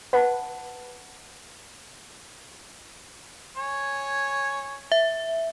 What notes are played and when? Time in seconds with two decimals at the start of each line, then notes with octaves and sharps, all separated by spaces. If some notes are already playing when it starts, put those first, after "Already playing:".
0.13 B4 F#5 A5
3.57 C#5 G#5
4.92 E5